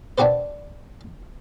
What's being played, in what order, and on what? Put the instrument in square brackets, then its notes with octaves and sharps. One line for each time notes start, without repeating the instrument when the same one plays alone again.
[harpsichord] D4 F#4 G4 B4 C5